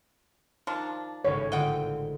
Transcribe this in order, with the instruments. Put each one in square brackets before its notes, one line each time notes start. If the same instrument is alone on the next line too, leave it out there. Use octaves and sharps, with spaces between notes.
[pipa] D#3 F3 D4
[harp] G#1 C#2 A2 [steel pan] C#5
[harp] D3 C4 F4 [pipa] D#5 F#5 G5